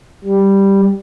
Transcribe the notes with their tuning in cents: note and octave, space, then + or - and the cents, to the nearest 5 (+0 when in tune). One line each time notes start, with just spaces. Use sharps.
G3 +0